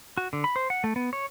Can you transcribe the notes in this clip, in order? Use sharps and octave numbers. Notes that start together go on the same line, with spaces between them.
F#4
D3
B5
C5
F#5
A3
B3
C#5